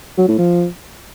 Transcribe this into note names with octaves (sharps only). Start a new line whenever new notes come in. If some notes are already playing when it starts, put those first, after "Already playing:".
F#3
A2
F3